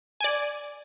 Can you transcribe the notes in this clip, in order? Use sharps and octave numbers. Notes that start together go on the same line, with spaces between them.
D5 G#5